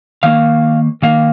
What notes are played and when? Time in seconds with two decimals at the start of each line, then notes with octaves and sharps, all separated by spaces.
0.23 D#3 A#3 F5
1.02 D#3 A#3 F5